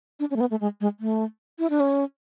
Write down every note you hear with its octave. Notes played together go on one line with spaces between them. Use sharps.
D4
C#4
A3
B3
A3
G#3
G#3
A3
E4
D4
C#4